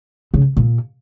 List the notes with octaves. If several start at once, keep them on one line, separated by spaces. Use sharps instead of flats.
C#3
A#2